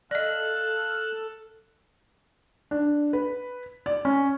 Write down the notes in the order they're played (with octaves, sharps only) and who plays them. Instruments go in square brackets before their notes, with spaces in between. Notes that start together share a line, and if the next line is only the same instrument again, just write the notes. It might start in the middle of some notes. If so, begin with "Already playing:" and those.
[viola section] A4 [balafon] D5 D#5 [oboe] F5 [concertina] F#6
[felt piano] D4
B4
D5
C#4